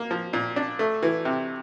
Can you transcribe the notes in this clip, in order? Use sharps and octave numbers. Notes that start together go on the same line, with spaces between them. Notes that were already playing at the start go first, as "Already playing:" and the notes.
Already playing: A#3
F3
A#2
D4
A3
E3
C3